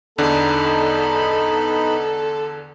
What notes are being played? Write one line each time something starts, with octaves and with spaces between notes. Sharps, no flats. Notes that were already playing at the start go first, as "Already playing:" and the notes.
E2 D3 B3 D4 D#4 A4 B5